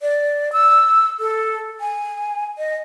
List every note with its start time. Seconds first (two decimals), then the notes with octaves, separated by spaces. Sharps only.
0.01 D5
0.53 E6
1.20 A4
1.80 G#5
2.58 D#5